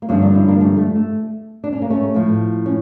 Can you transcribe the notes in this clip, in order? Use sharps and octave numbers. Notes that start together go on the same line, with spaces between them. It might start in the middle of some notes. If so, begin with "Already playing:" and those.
A#3
G2 D3 F3 A3 C#4
A#3 D4
C#4 E4
A#3 D4
A3 C#4
A3
A3
D4
C#4
A#3
A3 C#4
A2 F3
C#4